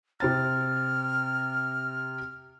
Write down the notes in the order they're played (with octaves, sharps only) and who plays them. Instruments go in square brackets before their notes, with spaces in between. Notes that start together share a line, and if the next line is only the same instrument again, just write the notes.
[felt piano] C3 C4 A6 [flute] F6